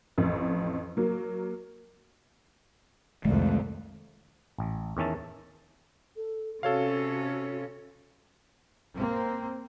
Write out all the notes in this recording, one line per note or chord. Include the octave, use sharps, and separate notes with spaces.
A1 F2
F#3 A#3
C2 F2 D#3 G#3 A3
A1
E2 D#3 C#4 E5 A5
A4
C3 C#4 F#4 A4 C#5 F5
A#3 C4